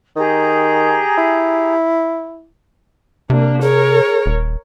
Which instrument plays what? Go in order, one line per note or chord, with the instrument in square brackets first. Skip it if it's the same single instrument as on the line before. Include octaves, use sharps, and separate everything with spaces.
[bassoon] D#3 [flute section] G4 G#4 A#5
[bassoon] E4
[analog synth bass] C3 [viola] A#3 D4
[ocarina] G#4 [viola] A#4 C#5
[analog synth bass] D#1